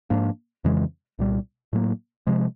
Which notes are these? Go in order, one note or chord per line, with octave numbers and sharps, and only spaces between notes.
G#2 F3 A#3 D4
F2 C#3 E3 G#3
C2 A#2 G3
A2 F#3 A#3
C3 F3 G#3